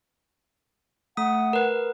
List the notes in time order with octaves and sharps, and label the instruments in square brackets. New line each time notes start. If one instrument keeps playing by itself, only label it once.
[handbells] A3 D#6 [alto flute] F#5
[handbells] A#4 B4